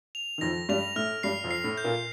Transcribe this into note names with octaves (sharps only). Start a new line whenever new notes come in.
F7
D#3
F2 F3 A#6
G2 G3 F7
A2 A3 F6
G2 G3 C7
F2 F3
C7
A2 A3
G6
A#2 A#3